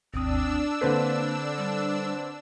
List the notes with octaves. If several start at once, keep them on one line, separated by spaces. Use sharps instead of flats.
G#1 D#2 C4 D4 D#6 E6
D3 A#3 C4 A4 B4
G3